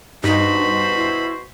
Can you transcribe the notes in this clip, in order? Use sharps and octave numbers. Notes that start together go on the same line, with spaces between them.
G2 B2 D#4 F#4 C5 B5
E4